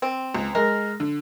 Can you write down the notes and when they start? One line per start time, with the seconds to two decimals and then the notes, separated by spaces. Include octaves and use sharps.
0.02 C4
0.35 C#2
0.55 G#3 A#4
1.00 D3